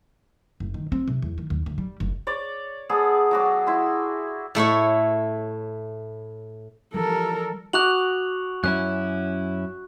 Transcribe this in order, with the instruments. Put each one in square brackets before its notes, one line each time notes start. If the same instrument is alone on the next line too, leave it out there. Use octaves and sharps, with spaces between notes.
[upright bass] F#1
D#3
C4
C3
E2
D#3
D#2
D2
G3
F#1
[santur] C#5 D5
B3 G#4 A4 D5
F#3 F#4 D6
E4 C6
[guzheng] A2 A3 E4 C#5
[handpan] E3 F3 G3 [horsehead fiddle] A4 A#4
[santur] F#4 D6 D#6 [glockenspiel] F#6 F7 F#7
[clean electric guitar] F#2 C#4 E4 [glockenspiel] F#6